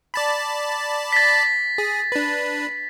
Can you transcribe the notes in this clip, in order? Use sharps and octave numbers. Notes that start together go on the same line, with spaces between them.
D5 A5 B5
A6 B6
G#4
D4 B4